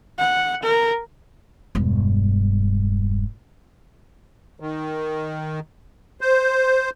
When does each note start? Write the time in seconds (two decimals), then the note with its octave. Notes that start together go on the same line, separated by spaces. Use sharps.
0.19 F#5
0.63 A#4
1.75 E1 G2
4.60 D#3
6.21 C5